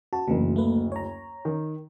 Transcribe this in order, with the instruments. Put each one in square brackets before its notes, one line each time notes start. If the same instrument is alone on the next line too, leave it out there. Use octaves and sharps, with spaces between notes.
[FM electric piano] F#4 [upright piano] A5
[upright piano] F#1 D2 [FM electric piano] C#3 E3
[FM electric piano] A3 A#3 B4
C#5 A#5
[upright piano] D#3